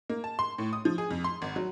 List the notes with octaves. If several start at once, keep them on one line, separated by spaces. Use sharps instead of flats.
A#3
A5
C6
A2
D#6
F3
G#4
F2
C6
G#1
F#3